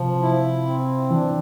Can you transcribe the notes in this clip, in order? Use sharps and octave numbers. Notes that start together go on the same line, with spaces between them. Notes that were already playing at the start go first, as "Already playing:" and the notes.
Already playing: C3 F3
E4
C4
E3 D4